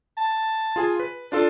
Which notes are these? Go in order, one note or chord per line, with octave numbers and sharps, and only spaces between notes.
A5
F4 G#4 G#5
B4
D4 F4 A4 A5